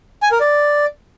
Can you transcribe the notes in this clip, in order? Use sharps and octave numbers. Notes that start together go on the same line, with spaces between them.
G#5
A#4
D5